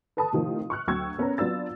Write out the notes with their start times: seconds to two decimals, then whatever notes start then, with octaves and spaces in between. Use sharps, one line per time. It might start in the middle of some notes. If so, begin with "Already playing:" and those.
0.17 A4 B4 A5 B5 D#6
0.33 A2 C3 D#3 F3
0.70 C#6 F6 F#6
0.87 D2 F#3 G5 C#6 E6 G#6
1.18 B3 C#4 A#4 C5 C#5 A#5
1.38 F#3 B3 D4 F4 E6 A6